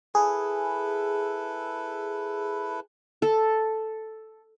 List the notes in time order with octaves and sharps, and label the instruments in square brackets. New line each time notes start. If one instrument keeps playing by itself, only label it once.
[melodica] E4 A4 B4 [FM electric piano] G#4
[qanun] A4